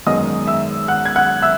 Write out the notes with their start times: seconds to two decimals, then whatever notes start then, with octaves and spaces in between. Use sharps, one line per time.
0.06 G#1 F#2 D#3 G#3 B3 D#5 D#6
0.47 E5 E6
0.88 F#5 F#6
1.05 G#6
1.16 F#5 F#6
1.42 E5 E6